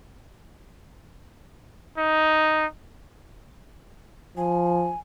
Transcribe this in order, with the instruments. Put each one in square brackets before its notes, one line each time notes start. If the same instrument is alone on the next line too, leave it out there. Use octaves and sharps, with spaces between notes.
[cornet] D#4
[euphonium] F3 [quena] G#5